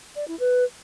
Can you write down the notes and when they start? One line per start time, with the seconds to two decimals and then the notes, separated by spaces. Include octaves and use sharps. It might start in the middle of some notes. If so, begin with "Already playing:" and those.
0.16 D5
0.28 E4
0.40 B4